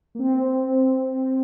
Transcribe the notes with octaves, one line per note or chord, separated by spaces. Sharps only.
A#3
C4